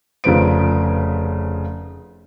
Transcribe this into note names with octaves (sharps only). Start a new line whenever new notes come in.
F1 C#3 F3 B4 C5 D7